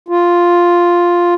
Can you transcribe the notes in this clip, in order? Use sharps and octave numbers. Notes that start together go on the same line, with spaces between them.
F4